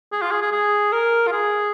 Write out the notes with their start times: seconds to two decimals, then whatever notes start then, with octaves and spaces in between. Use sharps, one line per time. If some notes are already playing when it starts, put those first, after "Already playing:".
0.12 G#4
0.22 F4
0.31 G#4
0.42 G#4
0.52 G#4
0.92 A#4
1.27 F4
1.32 G#4